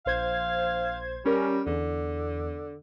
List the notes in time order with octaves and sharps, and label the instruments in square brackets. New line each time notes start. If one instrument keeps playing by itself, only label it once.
[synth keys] A#1 C5 G#6 [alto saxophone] F5
[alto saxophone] G3 [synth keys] C#4 A#4
[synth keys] E2 [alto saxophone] D3